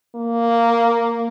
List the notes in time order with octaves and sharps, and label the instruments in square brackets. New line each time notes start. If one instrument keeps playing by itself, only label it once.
[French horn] A#3